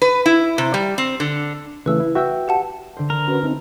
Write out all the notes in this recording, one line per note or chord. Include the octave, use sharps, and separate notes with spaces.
B4
E4
C3
G3
C4
D3
C#3 E3 A3 B4 E6
E4
F#4 B4 E5 G5 E6
G4 F#5 A5
D3 C5
A#4
C#4 F#4 B4
A3 C4 D#4